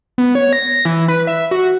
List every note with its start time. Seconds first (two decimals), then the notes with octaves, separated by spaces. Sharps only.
0.18 B3
0.35 C#5
0.53 A#6
0.85 E3
1.08 B4
1.27 E5
1.51 F#4